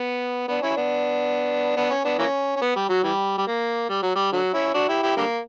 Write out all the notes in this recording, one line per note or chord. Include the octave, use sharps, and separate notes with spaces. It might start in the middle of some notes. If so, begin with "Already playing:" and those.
Already playing: B3
B3 D4
C#4 E4
B3 D4
B3 D4
C#4
B3 D4
E3 A#3 C#4
C#4
B3
G3
F#3
E3 G3
G3
A#3
G3
F#3
G3
D3 F#3
C#4 E4
D4 F#4
E4 G4
E4 G4
D3 G3 A#3